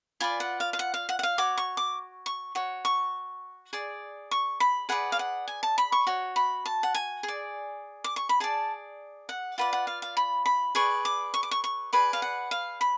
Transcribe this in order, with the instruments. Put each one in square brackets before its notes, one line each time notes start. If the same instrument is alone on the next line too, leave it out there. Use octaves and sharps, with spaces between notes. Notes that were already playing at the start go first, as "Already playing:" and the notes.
[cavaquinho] F4 B4 D5 G#5
F#5
F5
F5
F#5
F5
F#5
F#5
F5
F#4 C#5 D6
C#6
D6
C#6
F#4 C#5
C#6
G#4 D5
C#6
B5
G#4 B4 D5 F#5
F5
F#5
G#5
A5
B5
C#6
F#4 C#5
B5
A5
F#5
G#5
G#4
D5
D6
C#6
B5
G#4 D5 A5
F#5
F4 B4 D5 F#5
F#5
F5
F5
B5
B5
G#4 B4 D5 C#6
D6
C#6
D6
C#6
C#6
G#4 B4 D5 B5
F5
F#5
F5
B5